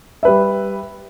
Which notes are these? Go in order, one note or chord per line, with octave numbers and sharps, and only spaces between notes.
G3 B4 E5